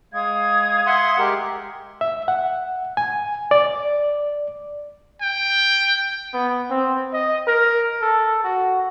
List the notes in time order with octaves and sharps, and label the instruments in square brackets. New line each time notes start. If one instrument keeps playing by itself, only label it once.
[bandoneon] G#3 [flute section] F5 D#6 G#6
[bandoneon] E5 F#5 C6
[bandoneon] G#3 G4 A#4 [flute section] C6
[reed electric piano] E5
F#5
G#5
D5
[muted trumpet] G5
[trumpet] B3
C4
D#5
A#4
A4
F#4